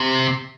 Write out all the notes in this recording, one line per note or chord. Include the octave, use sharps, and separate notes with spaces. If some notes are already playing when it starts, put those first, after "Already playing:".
Already playing: C3